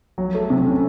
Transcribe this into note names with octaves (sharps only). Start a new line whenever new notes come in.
F#3
A3
C3
C#4